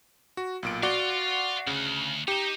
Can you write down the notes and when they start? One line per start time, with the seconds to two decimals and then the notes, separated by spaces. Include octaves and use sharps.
0.37 F#4
0.63 B1 A#2 D7
0.83 F#4 D5 F5 F#5 C6
1.67 D2 C#3
2.28 D#4 G4 E7